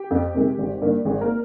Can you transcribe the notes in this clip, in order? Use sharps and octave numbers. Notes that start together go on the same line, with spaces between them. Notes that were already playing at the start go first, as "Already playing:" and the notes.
Already playing: G4 G5
F2
C3 D#3 G#3
G#1
G2 D#3 A#3
G#1 G#4
A#3 A#4